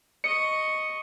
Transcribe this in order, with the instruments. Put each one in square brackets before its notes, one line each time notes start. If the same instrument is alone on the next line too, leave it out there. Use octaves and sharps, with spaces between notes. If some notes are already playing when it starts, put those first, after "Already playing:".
[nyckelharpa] D#5 C#6 [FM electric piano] C#7